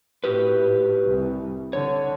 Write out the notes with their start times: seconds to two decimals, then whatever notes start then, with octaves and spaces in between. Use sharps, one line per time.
0.24 A2 F#4 G4 B4
1.06 C2
1.73 D3 C#5